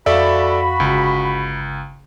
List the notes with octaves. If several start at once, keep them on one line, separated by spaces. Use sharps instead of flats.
F2 F#4 A4 D5 E5 F5 B5
G1 C#2 C#3